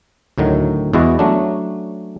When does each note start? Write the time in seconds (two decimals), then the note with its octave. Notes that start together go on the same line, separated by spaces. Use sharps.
0.38 D2 A2 D#3 F#3
0.93 E2 G#3 E4 F#4 D#5
1.19 F#3 A3 C#4 D4